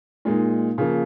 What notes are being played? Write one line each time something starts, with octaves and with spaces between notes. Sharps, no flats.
A#2 G#3 D#4
C#3 F3 A#3